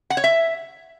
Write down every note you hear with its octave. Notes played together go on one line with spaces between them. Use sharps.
F#5
C#5
E5